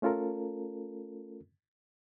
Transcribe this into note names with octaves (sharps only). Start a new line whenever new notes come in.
A3 C#4 F4 A4 A#4